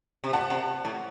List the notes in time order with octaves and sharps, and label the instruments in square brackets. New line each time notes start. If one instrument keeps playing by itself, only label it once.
[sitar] C3
[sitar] A#2 [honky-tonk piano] F#5 A5
[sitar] C3
A2